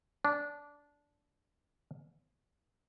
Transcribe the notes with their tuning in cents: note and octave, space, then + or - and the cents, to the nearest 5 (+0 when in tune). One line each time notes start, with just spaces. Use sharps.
D4 -15